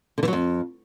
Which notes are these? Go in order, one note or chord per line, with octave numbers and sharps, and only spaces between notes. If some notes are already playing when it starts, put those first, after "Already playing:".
D3
E3
F#3
F2